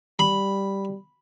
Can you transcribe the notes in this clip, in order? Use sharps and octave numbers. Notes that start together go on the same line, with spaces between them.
G3 B5